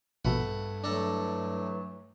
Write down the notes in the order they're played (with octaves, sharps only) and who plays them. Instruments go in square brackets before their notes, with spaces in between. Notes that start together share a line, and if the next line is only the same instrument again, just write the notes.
[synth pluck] A#1 B2 [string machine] G2 [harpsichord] A3 B4 F#5
[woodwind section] E3 F#3 A3 [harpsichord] D4 A4 A#5